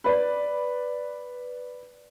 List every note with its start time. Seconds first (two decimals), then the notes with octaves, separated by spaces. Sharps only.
0.04 B4 D5